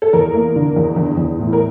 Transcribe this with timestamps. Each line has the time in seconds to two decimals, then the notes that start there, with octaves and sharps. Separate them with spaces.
0.02 A4
0.13 E2 A#4
0.34 A#3
0.56 D3
0.76 E2
0.96 E2
1.17 E2
1.39 A2
1.53 A#4